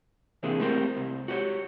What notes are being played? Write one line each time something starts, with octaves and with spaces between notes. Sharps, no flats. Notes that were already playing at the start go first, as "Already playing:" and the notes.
C3 E3 A#3 C4 D4 G#4
G3 A3 C4 E4 A#4 C5
C2
F#4 G4 C5 C#5